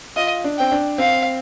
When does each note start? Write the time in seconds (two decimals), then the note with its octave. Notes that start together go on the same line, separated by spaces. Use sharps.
0.16 F4 D#5
0.44 D4
0.58 C4 G5
0.72 D4
0.98 C4 F5